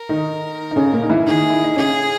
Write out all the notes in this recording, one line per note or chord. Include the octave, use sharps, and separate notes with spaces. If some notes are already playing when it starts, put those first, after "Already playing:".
Already playing: A#4
D#3 D#4
D#4
C#3 C#4
A#2 A#3
D#4
E3 E4
D#3 D#4 G#4
E4
D#4
C#3 C#4 G#4